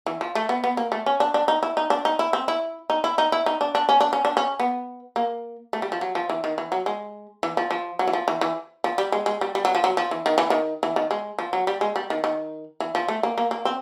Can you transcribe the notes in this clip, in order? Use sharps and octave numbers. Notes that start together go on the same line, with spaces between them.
E3
F3
A3
B3
B3
A#3
A3
C#4
D4
D4
D#4
E4
D#4
D4
D#4
E4
C4
E4
D#4
E4
D#4
E4
D#4
D4
D4
C#4
D4
C#4
D4
C#4
B3
A#3
A3
G3
F3
F#3
F3
E3
D#3
E3
F#3
G#3
E3
F3
F3
F#3
E3
F3
E3
E3
F3
G3
G#3
G#3
G3
G3
F#3
F3
F#3
F3
E3
D#3
E3
D#3
E3
D#3
G#3
F3
F#3
G3
G#3
G3
D#3
D#3
E3
F3
A3
A#3
A#3
A#3
C4